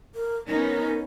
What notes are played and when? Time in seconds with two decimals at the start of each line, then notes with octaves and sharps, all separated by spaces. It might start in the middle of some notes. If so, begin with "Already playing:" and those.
0.15 A#4
0.48 B3 C#4 D#4 A#4